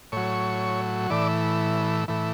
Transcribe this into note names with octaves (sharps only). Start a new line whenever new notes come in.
A2 F#3 C#5
A2 E3 D5
A2 E3